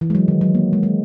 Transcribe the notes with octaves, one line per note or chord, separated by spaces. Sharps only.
E3
G#3
F#3
D#3
F#3
A#3
G#3
G#3